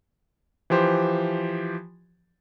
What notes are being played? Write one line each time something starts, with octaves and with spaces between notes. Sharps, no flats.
E3 F3 G4 C5